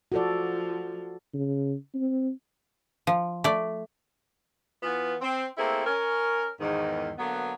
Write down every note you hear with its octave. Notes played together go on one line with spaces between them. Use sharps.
F3 F#4 A4 D5
C#3
C4
F3
A3 D5
E3 B3 F4
C4
A3 A#3 C4 E4 G#4 A4
C#4 A#4
E2 G#2 D#3
D3 F#3 A#3 B3